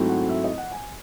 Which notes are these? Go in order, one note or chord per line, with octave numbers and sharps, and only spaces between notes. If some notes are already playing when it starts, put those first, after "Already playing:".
Already playing: G#2 F#3 A3 C4 E4
F#5
E5
D#5
F#5
G#5